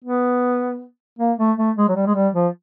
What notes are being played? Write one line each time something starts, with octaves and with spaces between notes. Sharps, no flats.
B3
A#3
A3
A3
G#3
F#3
G3
G#3
G3
F3